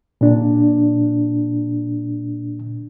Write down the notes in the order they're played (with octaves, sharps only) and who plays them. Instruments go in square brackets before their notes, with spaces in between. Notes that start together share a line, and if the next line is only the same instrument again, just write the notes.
[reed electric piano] A#2 D4